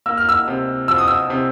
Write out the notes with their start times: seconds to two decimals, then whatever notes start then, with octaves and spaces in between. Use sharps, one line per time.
0.06 A#3 E6
0.18 F6
0.29 E6
0.48 C3
0.88 F3 E6
0.98 D#6
1.08 E6
1.30 C3